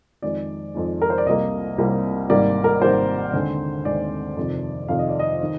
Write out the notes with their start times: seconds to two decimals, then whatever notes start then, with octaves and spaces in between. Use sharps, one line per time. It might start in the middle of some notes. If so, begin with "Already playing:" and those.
0.22 F2 D#3 G#3 D5
0.75 F2 D#3 G#3
1.02 A#4
1.10 C5
1.18 D5
1.26 C2 C3 G3 A#3 D#5
1.78 C2 C3 G3 A#3
2.30 G#1 G#2 G3 A#3 D5
2.64 A#4
2.82 G#1 G#2 G3 A#3 C5
3.33 D#2 D3 G#3 C4
3.85 D#2 D3 G#3 C4 D5
4.37 F2 C3 D#3
4.88 F2 C3 D#3 F5
4.99 D#5
5.09 D5
5.19 D#5
5.43 D#3